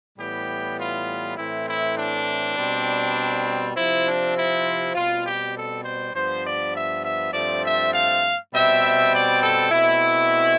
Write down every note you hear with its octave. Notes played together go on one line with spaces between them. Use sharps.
A2 E3 G3 B3 G4
F4
A2 E3 A3 C4 E4
E4
D4
B2 G3 C4
C3 F3 C4 E4
D4
E4
B2 G3 C4 F4
G4
A4
C5
G2 F3 B3 C5
D5
E5
E5
G2 F3 A3 C4 D5
E5
F5
B2 G3 C4 E5
D5
A4
B2 A3 C4 E4